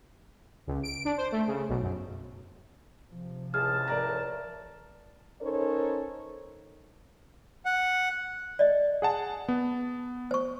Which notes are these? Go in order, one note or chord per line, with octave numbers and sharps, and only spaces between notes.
C#2
D7
D4
C5
A3
C#3
B1
F#2
C3 F3
C#2 A2 G#4 A5 F6
A#4 D5 A#5
C#4 D#4 A4 A#4 C5 C#5
F#5
D5 D#5
G#4 F#5 A5
B3
C5 C#6